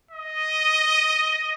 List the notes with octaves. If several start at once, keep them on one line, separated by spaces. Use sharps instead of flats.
D#5